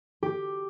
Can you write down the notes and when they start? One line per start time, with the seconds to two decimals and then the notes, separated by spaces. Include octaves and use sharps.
0.23 G4